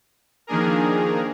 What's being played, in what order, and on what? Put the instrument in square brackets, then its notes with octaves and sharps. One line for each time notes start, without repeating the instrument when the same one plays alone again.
[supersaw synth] D#3 F3 A#3 D4 G#4 A#4